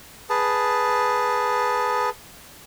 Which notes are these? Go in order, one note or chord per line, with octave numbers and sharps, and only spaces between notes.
G#4 B4 A5